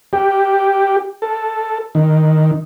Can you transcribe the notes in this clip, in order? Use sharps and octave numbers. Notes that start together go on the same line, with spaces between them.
G4
A4
D#3